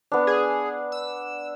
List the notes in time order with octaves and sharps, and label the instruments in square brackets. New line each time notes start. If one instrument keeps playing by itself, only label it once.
[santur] B3 D4
[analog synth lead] G#4
E6